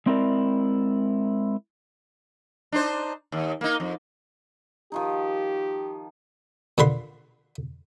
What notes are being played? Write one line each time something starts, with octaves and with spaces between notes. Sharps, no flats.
G#3 C4 E4 A#4 D5
D4 D#4 C5
D#2
A#3 D#4
F2
D#3 F3 D#4 G4
A#2 D3 B4 C6